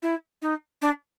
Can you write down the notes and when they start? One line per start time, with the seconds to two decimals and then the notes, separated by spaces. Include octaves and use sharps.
0.02 E4
0.42 D#4
0.81 D4